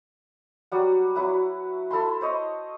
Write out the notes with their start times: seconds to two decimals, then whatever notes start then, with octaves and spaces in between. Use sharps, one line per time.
0.72 F#3 G3 F#5
1.16 F#3 E4 B4
1.91 E4 A4 B5 C6
2.21 C5 C#5 D#5